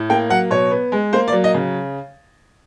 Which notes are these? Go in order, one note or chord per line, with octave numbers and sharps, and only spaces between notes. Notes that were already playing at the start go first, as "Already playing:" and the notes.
Already playing: A2
A#3 G5
F#3 F#5
B2 C#5
B3
G#3
A#3 C5
D5
F#3
D#5
C#3